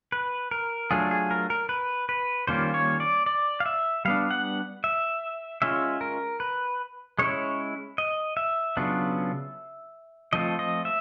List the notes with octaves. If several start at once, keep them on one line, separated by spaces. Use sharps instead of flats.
B4
A#4
F#3 A3 D4 F4 G#4
G#4
A#4
A#4
B4
B4
D#3 G3 A#3 C#4 F4 C5
C#5
D5
D5
F5
E5
G3 B3 D4 F5
F#5
E5
G#3 C#4 F4 E5
A#4
B4
G#3 C#4 E4 C#5
D#5
E5
C#3 F#3 B3 D4 F4
F3 A3 C4 F4 D#5
D#5
E5